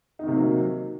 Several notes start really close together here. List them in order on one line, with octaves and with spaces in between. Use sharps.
D#4 D#3 C3 A#3 F#3